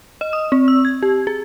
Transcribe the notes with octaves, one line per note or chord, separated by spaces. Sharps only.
D#5
D#6
C4
E6
G#6
G4
G#4